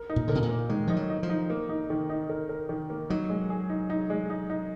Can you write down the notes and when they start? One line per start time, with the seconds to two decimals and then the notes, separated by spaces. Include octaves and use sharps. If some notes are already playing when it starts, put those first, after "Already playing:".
Already playing: A#4
0.10 D#4
0.16 A#2
0.28 D3 A#4
0.35 B2
0.43 A#2
0.49 A#3
0.69 D#3 G#3
0.87 F3 D#4
0.96 F#3
1.10 D#4
1.23 F3
1.30 D#4
1.50 A#3
1.69 D#4
1.90 D#3
2.10 D#4
2.29 A#4
2.49 A#4
2.69 D#3
2.90 A#3
3.10 F#3 D#4
3.30 G#3
3.50 G#4
3.70 D#4
3.90 D#4
4.10 G#3
4.30 D#4
4.50 D#4